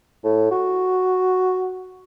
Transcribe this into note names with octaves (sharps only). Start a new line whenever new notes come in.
A2
F#4